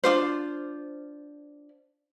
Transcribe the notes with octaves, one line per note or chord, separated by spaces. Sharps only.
D4 F4 C5